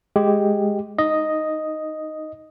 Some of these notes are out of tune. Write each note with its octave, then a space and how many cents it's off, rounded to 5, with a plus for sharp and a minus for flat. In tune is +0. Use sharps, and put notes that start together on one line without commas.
G#3 +0 G4 +0
D#4 +0 D#5 +0